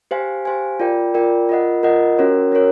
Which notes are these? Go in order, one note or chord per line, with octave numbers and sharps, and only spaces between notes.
G4 C5 F5 G#5
G4 C5 F5 G#5
F4 A#4 D5 G5
F4 A#4 D5 G5
F4 A#4 D#5 F#5
F4 A#4 D#5 F#5
C#4 F#4 A#4 C#5
C#4 F#4 A#4 C#5